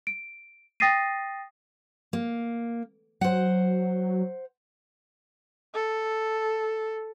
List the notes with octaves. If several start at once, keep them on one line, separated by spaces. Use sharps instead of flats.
D7
G5 D#6 A6 A#6 C7 D#7
A#3
F#3 C5 F#5
A4